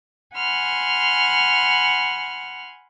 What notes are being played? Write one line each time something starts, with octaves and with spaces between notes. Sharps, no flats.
F#5 G#5 B5 C6 F6